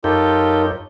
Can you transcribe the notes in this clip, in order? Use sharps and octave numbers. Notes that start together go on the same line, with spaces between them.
F#2 D#4 F4 G4 A4 A#4 C#5 G6